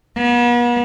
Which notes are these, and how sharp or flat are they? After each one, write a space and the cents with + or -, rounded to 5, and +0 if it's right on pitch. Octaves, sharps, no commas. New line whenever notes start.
B3 -40